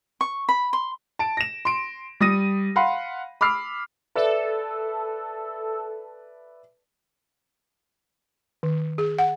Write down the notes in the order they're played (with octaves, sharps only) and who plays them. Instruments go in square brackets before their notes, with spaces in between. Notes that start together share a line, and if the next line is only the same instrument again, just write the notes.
[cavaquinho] C#6
B5
C6
[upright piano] A5 D7
A#6 E7
C6 D7
G3 D#6 A#6 D#7
F5 F#5 B5 C6
B5 D6 E6 F6 C7
[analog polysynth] A4 [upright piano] B4 D5 E5
[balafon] D#3
G#4
F#5